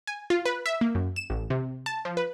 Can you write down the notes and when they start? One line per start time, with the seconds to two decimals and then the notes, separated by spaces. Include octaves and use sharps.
0.07 G#5
0.30 F4
0.45 B4
0.66 E5
0.81 A#3
0.95 F#2
1.16 E7
1.30 A1
1.50 C3
1.86 A5
2.05 F3
2.17 B4